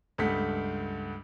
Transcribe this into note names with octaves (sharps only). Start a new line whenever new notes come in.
C#2 G2 A3 F#5 B6